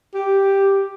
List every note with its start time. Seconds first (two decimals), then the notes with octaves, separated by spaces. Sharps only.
0.14 G4